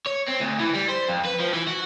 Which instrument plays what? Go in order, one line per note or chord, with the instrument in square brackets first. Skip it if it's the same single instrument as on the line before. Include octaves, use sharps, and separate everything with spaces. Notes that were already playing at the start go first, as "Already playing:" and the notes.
[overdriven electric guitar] C#5
C4
D2
E3
G3
C5
F2
B4
F3
E3
F#4